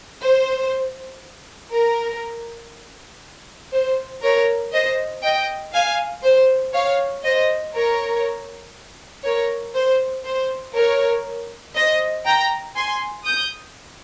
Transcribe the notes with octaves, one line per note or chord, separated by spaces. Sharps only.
C5
A#4
C5
A#4 C#5
C5 D#5
D#5 G5
F5 G#5
C5
C#5 F5
C5 D#5
A#4 C#5
A#4 C#5
C5
C5
A#4 C#5
C5 D#5
G5 A#5
G#5 C6
D#6 G6